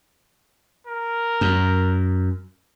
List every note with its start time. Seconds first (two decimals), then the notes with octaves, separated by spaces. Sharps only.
0.87 A#4
1.41 F#2